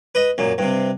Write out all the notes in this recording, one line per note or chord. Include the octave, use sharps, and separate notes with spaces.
B4 D#5
F#2 A#2
G2 C3